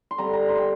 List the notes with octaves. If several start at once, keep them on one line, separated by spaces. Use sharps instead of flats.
C6
D3 G3 C4 A#5
A#5
C6
G5